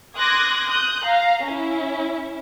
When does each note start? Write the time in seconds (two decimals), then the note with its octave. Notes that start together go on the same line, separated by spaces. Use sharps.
0.16 C6 D6 D#6 F#6 G#6 A#6
0.68 D#6 F#6 G6
1.04 F5 A#5
1.46 C#4 E4